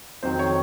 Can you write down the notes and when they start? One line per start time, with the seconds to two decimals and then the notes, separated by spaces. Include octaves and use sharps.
0.23 F2 D#3 F#3 C5
0.39 C#5